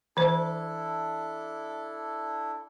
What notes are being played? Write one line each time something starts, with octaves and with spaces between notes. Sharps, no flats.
E3 D4 E4 A4 C5